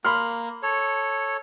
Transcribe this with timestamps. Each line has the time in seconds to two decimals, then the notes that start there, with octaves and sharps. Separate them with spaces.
0.05 A#3 B5 C6 F6
0.63 A4 C#5